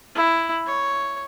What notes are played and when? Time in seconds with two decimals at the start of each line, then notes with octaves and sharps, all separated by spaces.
0.15 E4
0.66 C#5